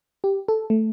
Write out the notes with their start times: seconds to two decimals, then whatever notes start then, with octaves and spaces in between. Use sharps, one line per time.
0.24 G4
0.48 A4
0.70 A3